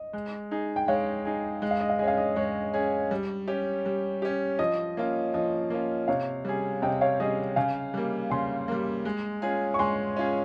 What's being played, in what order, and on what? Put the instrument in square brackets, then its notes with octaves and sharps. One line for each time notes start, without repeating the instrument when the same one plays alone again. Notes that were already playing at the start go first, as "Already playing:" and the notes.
Already playing: [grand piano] D#5
[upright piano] G#3
D#4 G#4
[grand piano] G5
[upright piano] G#3 [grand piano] C#5 F5
[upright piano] D#4 G#4
[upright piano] G#3 [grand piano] D#5
[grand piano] F5
D#5
F5
[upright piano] C#4 G#4 [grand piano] D#5
[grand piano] F5
D#5
[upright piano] G#3 [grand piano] C#5
[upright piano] C#4 G#4
G3
C#4 G4
G3
C#4 G4
[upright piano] F3 [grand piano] D#5
[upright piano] A#3 C#4 F4
[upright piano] F3 [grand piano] D#5
[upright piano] A#3 C#4 F4
[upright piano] C3 [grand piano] C#5 F5
[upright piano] G3 C#4 G#4
[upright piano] C3 [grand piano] D#5 G5
[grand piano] C#5 F5
[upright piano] G3 C#4 G#4 [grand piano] D#5
[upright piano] C#3 [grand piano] F5 G#5
[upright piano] G3 A#3
[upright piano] C#3 [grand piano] G#5 C6
[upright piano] G3 A#3
G#3
C#4 F4 G#4
[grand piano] C#6
[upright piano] G#3 [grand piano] G#5 C6
[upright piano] C#4 F4 G#4